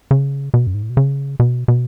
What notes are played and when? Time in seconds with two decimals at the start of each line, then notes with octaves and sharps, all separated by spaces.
0.11 C#3
0.54 B2
0.67 F#2
0.74 G#2
0.82 A2
0.90 B2
0.97 C#3
1.40 B2
1.68 B2